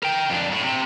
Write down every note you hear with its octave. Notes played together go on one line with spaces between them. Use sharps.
A#4 G5
F2 D4
A2
C3